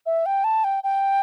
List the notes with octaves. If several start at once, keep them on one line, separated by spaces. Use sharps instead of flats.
E5
G5
A5
G5
G5